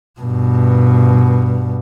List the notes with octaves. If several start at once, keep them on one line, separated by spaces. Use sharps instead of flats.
G2 B2